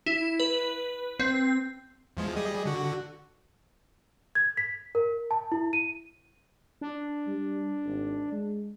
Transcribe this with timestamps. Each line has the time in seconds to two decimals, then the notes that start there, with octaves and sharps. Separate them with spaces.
0.06 E4
0.40 B4
1.19 C4
2.17 E2 F3 G#3
2.36 G3 G#4 D#5
2.65 D3 F#4
4.35 G#6
4.57 B6
4.95 A#4
5.31 A5
5.52 E4
5.73 D#7
6.81 D4
7.27 G3
7.85 G#1
8.32 G#3